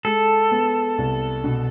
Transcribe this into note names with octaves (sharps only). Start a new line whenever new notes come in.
G#3 A4
B3
C2
B2